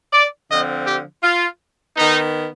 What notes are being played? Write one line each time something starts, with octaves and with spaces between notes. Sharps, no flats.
D5
D3 F3 C4 D#5
G4
F4
D#3 B3 D#4